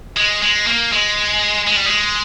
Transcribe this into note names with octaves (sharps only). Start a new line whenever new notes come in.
G#3
G#3
A#3
G#3
G#3
G3
G#3